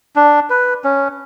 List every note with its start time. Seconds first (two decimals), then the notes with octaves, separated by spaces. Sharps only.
0.16 D4
0.50 B4
0.84 C#4